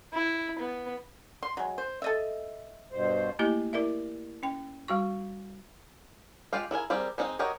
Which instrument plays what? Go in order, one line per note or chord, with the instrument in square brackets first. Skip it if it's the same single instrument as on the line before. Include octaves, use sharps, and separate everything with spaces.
[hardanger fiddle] E4
B3
[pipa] C6
F#3 G#3
C5
A4 D#5 E5
[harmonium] G2 B2 C5
[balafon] A3 A#3 E4 G4 D#5
E4 A#4 D5 E5
C#4 G5
G3 F#4 C#6
[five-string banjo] G#3 F4 G4 F5
E4 G#4 A#4 G#5
G3 C4 G4 G#4 A#4
G#3 C4 D#4 A#4 D#5
F#4 G4 A#4 C#5 D#5